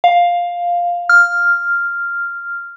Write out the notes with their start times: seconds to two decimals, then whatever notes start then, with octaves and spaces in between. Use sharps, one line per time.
0.04 F5
1.09 F6